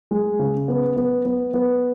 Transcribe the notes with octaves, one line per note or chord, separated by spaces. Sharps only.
G#3
C#3
B3
B3
B3
B3